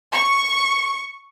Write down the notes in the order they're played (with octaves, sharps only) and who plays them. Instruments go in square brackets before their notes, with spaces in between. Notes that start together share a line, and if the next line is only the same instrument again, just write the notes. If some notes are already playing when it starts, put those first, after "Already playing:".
[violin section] C#6